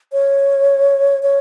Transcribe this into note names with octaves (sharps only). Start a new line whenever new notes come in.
C#5
C#5